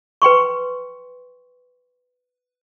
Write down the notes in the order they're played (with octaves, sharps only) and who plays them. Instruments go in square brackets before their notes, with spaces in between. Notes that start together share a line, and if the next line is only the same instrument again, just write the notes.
[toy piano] B4 G5 C6 C#6